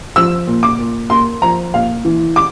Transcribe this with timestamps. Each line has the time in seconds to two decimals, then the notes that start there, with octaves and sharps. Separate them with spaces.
0.16 F3 E6
0.47 A#2
0.63 D6
0.79 A#2
1.10 A#3 C6
1.42 F3 A#5
1.74 A#2 F5
2.05 E3
2.36 D6